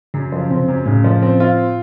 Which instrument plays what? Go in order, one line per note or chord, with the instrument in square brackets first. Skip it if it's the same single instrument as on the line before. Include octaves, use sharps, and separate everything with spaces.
[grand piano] F#2 [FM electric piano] C#3
[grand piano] F3
[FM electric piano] C3 [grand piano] C4
[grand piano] F#2
[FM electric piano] A2 [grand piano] C#3
[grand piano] F3
C4
F4